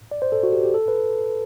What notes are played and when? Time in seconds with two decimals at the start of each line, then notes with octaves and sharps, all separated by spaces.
0.11 D5
0.22 C5
0.32 A4
0.43 F#4
0.53 G4
0.63 G4
0.74 A4
0.88 B4